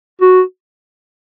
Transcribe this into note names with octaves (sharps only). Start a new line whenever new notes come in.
F#4